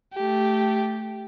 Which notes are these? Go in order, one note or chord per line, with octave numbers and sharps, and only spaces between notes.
A3 G4